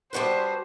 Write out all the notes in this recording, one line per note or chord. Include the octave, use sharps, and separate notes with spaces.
G3 B3 D4 F#4 B4 C5